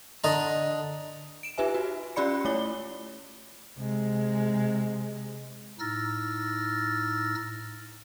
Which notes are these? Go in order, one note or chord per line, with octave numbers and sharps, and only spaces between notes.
D3 D#5 A#5
D7 E7
D#4 F4 G4 B4 E5 G#5
F#4
C#4 F4 G4 D5 B5 C#7
A3 E4 C#5 G7
C3 G#3
A2 D#4 E6 F6 A6 A#6